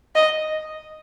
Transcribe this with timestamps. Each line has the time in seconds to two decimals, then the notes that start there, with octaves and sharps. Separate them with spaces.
0.15 D#5